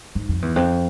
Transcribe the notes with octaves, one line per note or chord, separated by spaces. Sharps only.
G#2
F2
E2
F2